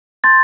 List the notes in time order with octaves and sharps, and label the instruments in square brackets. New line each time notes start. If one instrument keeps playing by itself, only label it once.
[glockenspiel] A5 C6 G6 A6